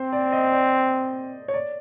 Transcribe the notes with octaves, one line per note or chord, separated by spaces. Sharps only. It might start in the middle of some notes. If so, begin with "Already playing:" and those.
Already playing: C4 C5
D5
D#5
D5
C#5
D5